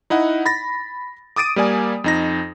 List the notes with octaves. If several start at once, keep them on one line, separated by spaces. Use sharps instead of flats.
D#4 E4 D#5 F#5
B5 A6 A#6
D6 D#6 A6 D7 D#7
G3 A#3 D5 G#5
F2 D#4 A#6